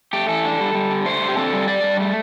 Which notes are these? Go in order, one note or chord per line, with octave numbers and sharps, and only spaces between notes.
A3 G4
E3 A4
D4
G3
G3
D3
A3 C5
D3
G4
C4 A4
G3
D4 D5
G3
A3